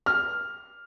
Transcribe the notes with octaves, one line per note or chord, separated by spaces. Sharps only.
F6